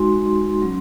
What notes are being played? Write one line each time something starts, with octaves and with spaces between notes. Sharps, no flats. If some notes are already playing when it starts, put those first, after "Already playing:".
Already playing: G#3 D#4 F#4 C6
F#3 C#4